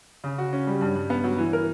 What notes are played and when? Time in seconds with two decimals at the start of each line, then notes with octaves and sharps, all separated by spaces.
0.24 C#3
0.38 F#4
0.53 C#4
0.67 G3
0.81 G2
0.96 G2
1.10 B3
1.24 F#3
1.38 E3
1.53 A#4